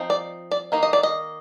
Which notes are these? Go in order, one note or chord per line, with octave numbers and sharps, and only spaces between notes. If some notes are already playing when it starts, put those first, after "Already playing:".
Already playing: F3 C4 D#4
D5
D5
D#3 A#3 D#4
D#5
D5
D#5